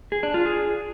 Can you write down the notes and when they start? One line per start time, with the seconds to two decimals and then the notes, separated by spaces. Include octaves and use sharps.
0.12 G#4
0.23 D4
0.34 F4
0.45 G#4